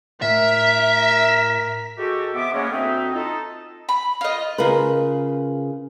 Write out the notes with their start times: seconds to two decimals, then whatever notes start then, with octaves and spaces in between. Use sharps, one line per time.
0.22 A2 A#4 E5 B6
1.98 G#3 F#4 G4 A4
2.34 C3 B3 E5 D6
2.53 G#3 A#3 B3 C#4
2.72 D2 C4 D#4 E5
3.14 D#4 F4 A4 A#5
3.89 B5
4.21 F4 D#5
4.58 C#3 F4 A#4 B4